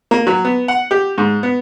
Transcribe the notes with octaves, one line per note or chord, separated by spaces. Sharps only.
A#3
F#3
B3
F#5
G4
G#2
B3